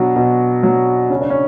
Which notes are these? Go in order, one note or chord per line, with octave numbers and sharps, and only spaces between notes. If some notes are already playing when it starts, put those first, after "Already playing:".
Already playing: B2 F#3 D4
B2
F#3
C#3 C#4
D4
C#4